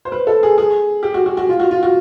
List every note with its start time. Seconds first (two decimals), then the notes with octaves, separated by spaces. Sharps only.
0.05 C5
0.12 B4
0.27 A4
0.43 G#4
0.58 G#4
1.03 G4
1.14 F#4
1.26 F#4
1.37 F#4
1.49 F4
1.60 F#4
1.71 F4
1.83 F#4